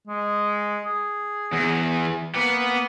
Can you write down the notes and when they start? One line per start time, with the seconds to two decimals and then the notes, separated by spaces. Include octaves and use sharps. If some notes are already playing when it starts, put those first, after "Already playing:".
0.07 G#3
0.86 G#4
1.53 E2
2.35 A#3 B3 B4